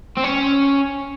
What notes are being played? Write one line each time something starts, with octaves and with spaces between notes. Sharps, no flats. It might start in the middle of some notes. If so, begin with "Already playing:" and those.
C4
C#4